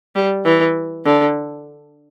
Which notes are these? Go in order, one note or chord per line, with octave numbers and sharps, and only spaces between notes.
G3
E3
D3